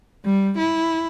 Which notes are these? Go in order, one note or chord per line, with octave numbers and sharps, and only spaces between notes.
G3
E4